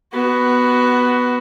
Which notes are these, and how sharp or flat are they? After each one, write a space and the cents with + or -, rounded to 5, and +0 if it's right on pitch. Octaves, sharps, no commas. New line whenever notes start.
B3 +0 F#4 +15